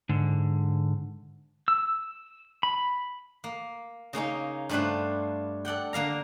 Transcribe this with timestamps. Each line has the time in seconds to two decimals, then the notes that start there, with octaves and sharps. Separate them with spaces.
0.09 G#2 D3
1.68 E6
2.63 B5
3.44 A#3
4.13 C#3 A#3 C#4 D#4
4.69 G2 A3 D4 F4 B4 C5
5.65 A4 D5 F#5 G5
5.93 D3 A#3 F5 A#5